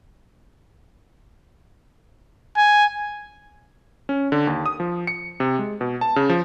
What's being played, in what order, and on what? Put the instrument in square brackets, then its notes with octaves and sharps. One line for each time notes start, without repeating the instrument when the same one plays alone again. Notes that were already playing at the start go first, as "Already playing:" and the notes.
[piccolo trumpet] G#5
[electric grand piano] C#4
D3
D#2
D#6
F3
C#7
C3
G#3
B2
A5
C#3
F3